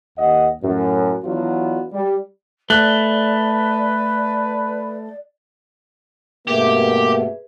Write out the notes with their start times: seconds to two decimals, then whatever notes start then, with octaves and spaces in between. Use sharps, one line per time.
0.17 D#2 D#5 F#5
0.61 F#2 A2
1.24 E3 F#3 B3 D4 F4 F#4
1.93 G3
2.70 A3 B4 D5 F#6
6.47 G2 B2 A3 A#3 G4 G#4 B4 E5